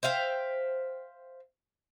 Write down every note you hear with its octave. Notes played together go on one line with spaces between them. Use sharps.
C5 E5 F5 G5